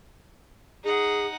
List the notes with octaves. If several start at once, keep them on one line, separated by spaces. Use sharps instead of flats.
D#4 G#4 F#5